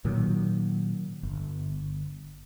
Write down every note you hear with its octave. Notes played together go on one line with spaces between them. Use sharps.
A#2 D#3 F#3
G1